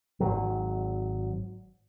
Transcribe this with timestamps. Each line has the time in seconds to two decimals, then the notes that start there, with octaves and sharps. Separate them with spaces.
0.20 G#1 F#3